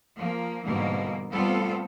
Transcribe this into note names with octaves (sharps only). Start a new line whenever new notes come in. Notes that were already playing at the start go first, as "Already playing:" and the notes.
F3 A#3
G#2 B2 D3 E3 G3 A#3
G3 A3 B3 C4 F4 A4